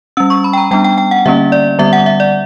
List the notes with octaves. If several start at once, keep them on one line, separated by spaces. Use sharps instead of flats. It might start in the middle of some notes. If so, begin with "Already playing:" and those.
G3 C#4 E6
C#6
B5
G5
A#5
G3 B3 D4 G5
G5
G5
F#5
D3 G3 A#3 C#4 E5
D5
D3 G3 B3 E5
F#5
E5
D5